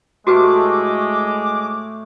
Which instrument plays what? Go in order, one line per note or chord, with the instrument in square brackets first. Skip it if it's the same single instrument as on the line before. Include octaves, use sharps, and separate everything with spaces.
[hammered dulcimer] A2 A3 [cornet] G#3 [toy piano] F#4 G4 B4 [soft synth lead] D6